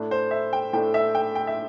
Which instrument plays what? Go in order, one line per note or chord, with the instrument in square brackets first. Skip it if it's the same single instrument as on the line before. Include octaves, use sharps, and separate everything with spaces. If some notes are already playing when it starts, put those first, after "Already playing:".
Already playing: [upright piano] A2 A3 D4
C5
E5
G5
A2 A3 D4 G5
E5
G5
G5
E5